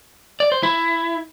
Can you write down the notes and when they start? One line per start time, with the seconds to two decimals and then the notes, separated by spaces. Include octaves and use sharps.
0.40 D5
0.52 C5
0.63 E4